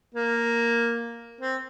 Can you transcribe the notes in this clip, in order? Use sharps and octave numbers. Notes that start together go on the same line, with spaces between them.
A#3
C4